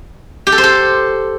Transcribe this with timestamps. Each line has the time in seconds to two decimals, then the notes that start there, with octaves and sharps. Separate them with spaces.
0.47 G4
0.52 A4
0.58 C5
0.63 A4